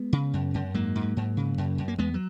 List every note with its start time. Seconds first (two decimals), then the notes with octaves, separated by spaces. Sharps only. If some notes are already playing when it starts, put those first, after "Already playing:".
Already playing: G#3 B3
0.13 C#3
0.33 F#2
0.54 F#2
0.74 G#2 F#3 A#3
0.95 G#2
1.17 G#2
1.37 C#3
1.58 F#2
1.78 F#2
1.88 A#3
1.98 E2 G#3 B3
2.14 F#3